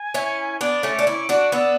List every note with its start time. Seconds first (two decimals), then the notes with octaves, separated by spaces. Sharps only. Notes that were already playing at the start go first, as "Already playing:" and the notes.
Already playing: G#5
0.14 C#4 E4
0.60 B3 D4 D6
0.83 A3 C#4
0.99 D4
1.07 C#4 E4
1.29 D4 F#4
1.52 B3 D4 E6